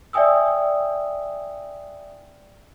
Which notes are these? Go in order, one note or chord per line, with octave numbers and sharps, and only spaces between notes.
D5 E5 G5 G#5 D#6 E6